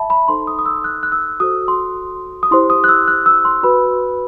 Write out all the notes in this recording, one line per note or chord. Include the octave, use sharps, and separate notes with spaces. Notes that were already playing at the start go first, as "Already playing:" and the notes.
Already playing: E5 A5 B5
B5
D#4 A4 C5 C6
D#6
D#6
E6
F#6
F#6
E6
F#4 A4 C5 D#6
C6
D#6
E4 G4 C5 C6
D#6
F#6
E6
F#6
E6
C6
F#4 B4 B5